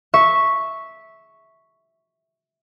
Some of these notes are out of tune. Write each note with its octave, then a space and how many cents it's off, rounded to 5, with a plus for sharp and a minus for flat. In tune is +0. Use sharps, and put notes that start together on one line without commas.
E5 -10 C#6 +0